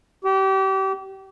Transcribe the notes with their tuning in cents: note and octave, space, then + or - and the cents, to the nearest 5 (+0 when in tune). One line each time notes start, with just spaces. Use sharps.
G4 -30